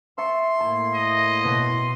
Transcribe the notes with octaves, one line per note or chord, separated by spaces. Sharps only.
E5 A5 C6 C#6
A2 A#3 E4 A5
D#5
B2 B6